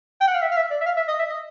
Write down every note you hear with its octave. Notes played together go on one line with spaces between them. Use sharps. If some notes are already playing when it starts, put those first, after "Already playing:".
G5
F#5
F5
E5
F5
E5
D5
E5
F5
E5
D#5
E5
D#5